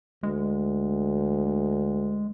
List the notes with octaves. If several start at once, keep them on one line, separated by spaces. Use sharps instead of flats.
D2 G#3